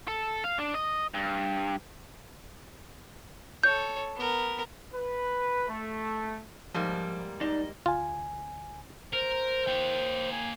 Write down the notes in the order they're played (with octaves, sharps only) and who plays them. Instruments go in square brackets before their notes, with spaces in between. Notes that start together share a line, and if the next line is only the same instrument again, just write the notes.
[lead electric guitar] A4
F5
D4
D#5
G2
[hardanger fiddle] A4 C#5 [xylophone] G6
[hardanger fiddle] B3 A#4
[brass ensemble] B4
A3
[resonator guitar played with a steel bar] G#2 G3 A#3 [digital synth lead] F3
[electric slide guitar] D#4 D5 [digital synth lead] D#5
[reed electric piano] D2 G#5 [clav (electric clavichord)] F4
[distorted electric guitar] A#4 [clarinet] C5
[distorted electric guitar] A#3 G5
[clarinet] G#5